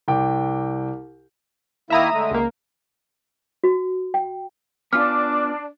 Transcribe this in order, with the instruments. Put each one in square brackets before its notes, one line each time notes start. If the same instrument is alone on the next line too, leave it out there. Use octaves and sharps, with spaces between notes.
[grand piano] C2 G5 D6
[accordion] D#3 A#3 E4 [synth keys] E5 A#5 D#6
[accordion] D3 G#3 A3
[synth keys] C#2 A#3
[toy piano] F#4
G5
[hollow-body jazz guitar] B3 C#4 F4 [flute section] D4 [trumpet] D6 [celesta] F6